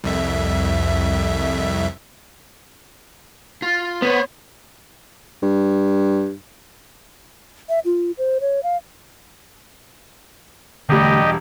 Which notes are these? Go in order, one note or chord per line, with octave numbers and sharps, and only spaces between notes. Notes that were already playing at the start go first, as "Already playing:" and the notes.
C2 F2 E5
F4
B3 C5 C#5
G2
E5
F4
C5
C#5
F5
E1 D3 G3 A3 G4 D#5